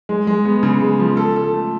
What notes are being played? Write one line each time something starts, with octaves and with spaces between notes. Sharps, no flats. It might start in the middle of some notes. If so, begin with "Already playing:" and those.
G#3
G#3
B3
C#3
G#3
F3
A4
A4
A3